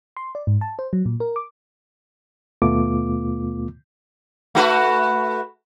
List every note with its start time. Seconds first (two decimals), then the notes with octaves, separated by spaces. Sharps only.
0.17 C6
0.35 D5
0.47 G#2
0.61 A5
0.79 C5
0.93 F#3
1.06 A#2
1.20 A#4
1.36 D6
2.62 D#2 B2 A3 B3 F4 D6
4.55 A3 F#4 B4